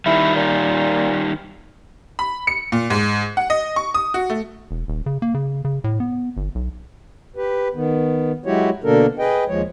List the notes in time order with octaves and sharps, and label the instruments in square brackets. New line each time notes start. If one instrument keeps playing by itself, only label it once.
[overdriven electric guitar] D#3 G3 [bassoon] E4
[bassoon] A#2
[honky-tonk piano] B5
C#7
A#2
G#2
F#5
D#5
C#6
D#6
F#4
A3
[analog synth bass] E1
D#1
C#3
A#3
C#3
C#3
A2
B3
G1
B1
[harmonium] G4 B4
D#3 B3
F#3 G#3 E4 F#4 G4 C#5
B2 D3 A#3 D4 A4 A#4
G#4 B4 D#5 G5
D#2 F3 G#3 C#5